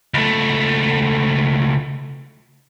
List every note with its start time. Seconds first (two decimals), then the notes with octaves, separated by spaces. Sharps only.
0.14 C#2 A3